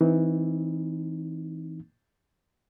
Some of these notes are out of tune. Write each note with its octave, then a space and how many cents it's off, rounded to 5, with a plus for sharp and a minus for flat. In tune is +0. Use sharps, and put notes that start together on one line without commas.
E3 -15 C4 -10 D#4 +0